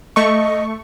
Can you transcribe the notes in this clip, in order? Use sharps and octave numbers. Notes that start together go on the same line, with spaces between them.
A3 D#5 C#6